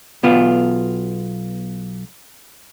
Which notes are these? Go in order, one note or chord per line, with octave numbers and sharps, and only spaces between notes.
B1 B3 F4